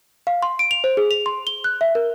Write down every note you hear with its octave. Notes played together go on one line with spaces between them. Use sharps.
F5
C6
D7
F7
C5
G#4
F7
C6
G7
F#6
E5
A#4